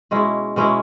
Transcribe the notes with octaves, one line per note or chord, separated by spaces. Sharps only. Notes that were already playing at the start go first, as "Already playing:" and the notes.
B2 G#3 C#4 E4
B2 G#3 C#4 E4